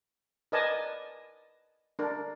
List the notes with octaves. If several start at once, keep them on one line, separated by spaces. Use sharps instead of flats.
A#4 B4 D5 D#5 G#5 A5
D4 A#4